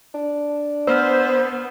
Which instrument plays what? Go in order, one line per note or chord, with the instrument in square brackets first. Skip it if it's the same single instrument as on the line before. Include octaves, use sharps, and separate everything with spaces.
[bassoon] D4
[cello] B3 [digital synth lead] C5 [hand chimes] E6 F6